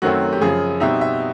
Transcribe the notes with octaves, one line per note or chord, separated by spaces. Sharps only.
F#2 D#3 F#3 A3 C4 F#4
G4
F#2 C#3 F3 G#4
B2 G3 C4 D#4 E5
E5